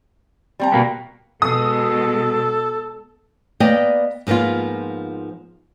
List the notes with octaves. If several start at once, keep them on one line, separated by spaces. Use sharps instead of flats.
G3 C4 A#5
B2 A#3 B3
B2 G#3 A4 D#6
A#3 B3 D5 D#5 G5
G#2 F3 A#3 B3 F4